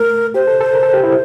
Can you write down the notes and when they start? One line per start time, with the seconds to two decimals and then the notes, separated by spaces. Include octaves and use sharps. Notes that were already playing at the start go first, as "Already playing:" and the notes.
Already playing: A3 A#4
0.34 G4 C5
0.47 A4
0.61 A4
0.74 A#4
0.83 A4
0.94 G4
1.03 E4